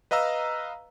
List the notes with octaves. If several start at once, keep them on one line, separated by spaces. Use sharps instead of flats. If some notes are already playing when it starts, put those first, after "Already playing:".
B4 D#5 F5 A#5 E6